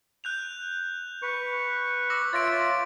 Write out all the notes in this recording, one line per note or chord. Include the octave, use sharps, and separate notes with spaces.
F#6 G6 F7
B4 C#6
D6 E6 A#6
F4 C#5 E5 A6 A#6 D7